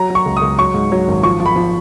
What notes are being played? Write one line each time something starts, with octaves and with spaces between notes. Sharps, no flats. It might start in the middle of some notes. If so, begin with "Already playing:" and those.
Already playing: F#3 A#5
F#3
C#6
C#2
D#6
C#2
F#3 C#6
G#2
F#3
G#1
F3 C#6
F3
B5
F3